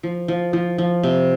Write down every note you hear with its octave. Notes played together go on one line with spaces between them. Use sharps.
F3
F3
F3
F3
C3